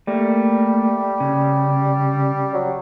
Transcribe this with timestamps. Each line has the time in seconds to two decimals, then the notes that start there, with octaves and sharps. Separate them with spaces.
0.07 G3 A3 A#3
1.20 C#3
2.54 F#3